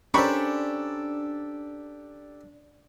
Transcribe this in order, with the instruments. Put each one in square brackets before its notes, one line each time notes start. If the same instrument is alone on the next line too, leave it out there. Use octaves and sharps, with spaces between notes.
[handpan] C#4 C5 [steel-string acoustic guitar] D4 [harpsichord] G4 A4 [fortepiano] A#4 B5 C#6